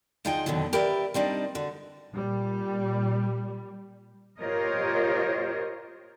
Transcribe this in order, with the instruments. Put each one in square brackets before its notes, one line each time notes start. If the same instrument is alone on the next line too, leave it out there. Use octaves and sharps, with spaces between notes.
[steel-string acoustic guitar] D2 F3 D#4 F4 G#4 G5
F2 G#2 B2 D3 D#3 F#3
G4 A#4 B4 C#5 D5 E5
G3 C4 D4 D#4
D3 F#4
[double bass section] A#2 G3
[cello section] F4 G4 A#4 C5 C#5 D#5